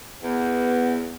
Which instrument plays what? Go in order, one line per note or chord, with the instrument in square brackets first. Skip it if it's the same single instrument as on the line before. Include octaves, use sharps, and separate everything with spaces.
[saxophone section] E2 [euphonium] B3